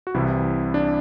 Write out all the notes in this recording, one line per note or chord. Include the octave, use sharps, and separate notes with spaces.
F#4
C2 C3 E3 E4
D4